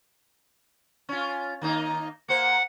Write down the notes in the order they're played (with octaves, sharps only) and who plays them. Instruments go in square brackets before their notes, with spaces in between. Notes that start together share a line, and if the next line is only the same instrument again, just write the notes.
[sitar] C#4 F4
D#3 A#3 D#4
[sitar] A#3 C5 [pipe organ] F#5